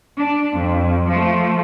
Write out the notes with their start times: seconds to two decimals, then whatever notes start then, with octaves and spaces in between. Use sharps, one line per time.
0.18 D4
0.56 F2
1.08 F3 A3